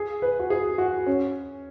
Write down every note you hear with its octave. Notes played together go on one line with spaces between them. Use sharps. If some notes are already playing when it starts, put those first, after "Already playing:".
Already playing: G#4
B4
F#4
G#4
F#4
C#4